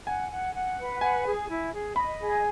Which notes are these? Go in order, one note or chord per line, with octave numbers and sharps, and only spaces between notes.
F#5 G#5
F#5
F#5
B4
F#5 G#5
G#4
E4
G#4
D#5 B5
G#4